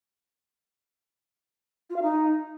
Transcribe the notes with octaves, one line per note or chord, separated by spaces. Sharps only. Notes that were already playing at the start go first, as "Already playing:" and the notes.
F4
F5
D#4